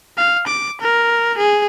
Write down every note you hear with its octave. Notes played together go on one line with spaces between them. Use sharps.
F5
D6
A#4
G#4